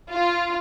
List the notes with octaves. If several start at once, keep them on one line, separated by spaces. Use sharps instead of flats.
F4